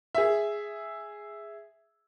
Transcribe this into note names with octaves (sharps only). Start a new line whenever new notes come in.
G#4 E5